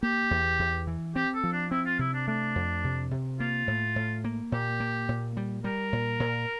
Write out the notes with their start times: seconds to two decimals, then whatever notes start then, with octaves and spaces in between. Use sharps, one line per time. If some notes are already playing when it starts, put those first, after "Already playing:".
0.03 A#3 G4
0.31 E2
0.59 E2
0.87 E3
1.15 C4 G4
1.35 A4
1.44 F3
1.52 D4
1.71 C4 E4
1.86 F4
1.99 C3 E4
2.13 D4
2.27 A3 D4
2.55 F2
2.84 C3
3.11 C3
3.40 A#3 F4
3.68 A2
3.96 A2
4.24 A#3
4.52 A#2 G4
4.80 A#3
5.09 A#2
5.37 G3
5.64 G3 A#4
5.93 A#2
6.20 A#2